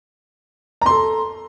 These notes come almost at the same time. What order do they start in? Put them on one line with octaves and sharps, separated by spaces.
A#5 C6 A4